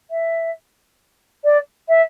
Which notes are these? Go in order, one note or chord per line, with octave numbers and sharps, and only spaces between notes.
E5
D5
E5